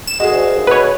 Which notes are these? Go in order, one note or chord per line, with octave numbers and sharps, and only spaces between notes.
E7
G#3 F#4 G#4
D2
D#2
B2 B4 C#5